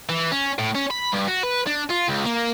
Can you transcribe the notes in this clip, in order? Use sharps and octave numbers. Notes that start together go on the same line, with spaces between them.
E3
C#4
A2
C#4
B5
G2
F#4
B4
D4
F4
C#2
A#3